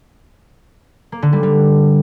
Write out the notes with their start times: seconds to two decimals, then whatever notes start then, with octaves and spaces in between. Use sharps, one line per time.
1.12 A#3
1.22 D3
1.33 G3
1.43 G3